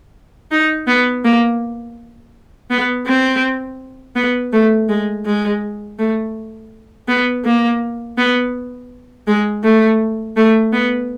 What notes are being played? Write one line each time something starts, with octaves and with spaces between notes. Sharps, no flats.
D#4
B3
A#3
B3
C4
B3
A3
G#3
G#3
A3
B3
A#3
B3
G#3
A3
A3
B3